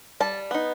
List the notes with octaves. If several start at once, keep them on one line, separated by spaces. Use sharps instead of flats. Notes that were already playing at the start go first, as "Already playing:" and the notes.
G3 A5
B3 D#4